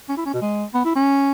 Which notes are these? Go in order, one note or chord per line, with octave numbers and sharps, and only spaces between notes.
C#4
E4
C#4
B2
G#3
B3
E4
C#4